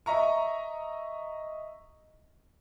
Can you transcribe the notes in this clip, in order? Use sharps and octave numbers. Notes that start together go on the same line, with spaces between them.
D#5 E5 A#5 C#6